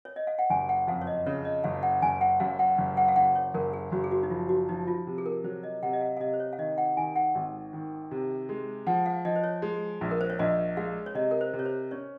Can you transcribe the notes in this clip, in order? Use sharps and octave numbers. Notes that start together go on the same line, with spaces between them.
C#5
D#5
F5
F#5
F#1 G#5
F#5
F2 F5
C#5
D#5
C#3 C#5
D#5
F#1 F5
F#5
F#1 G#5
F#5
F#2 F5
F#5
F#1
F#5
F5
F#1 F#5
C#5
F#1 A#4
G#4
F#1 F#4
G#4
F#4
D#4
F3 F4
F#4
F3 D#4
F4
C3
G#4
A#4
F#3 C5
D#5
C3 F#5
D#5
F5
F5
C3 D#5
C5
C#5
F5
D#3 D#5
F#5
D#3 G#5
F#5
G#1
D#3
C3
G#3
F3 F#5
F5
F3 D#5
C5
C#5
G#3
A#1
A#4
C5
C#5
A#1 D#5
G#3 F5
C#5
C3 D#5
A#4
C5
C3
C#5
C5
C#4 C#5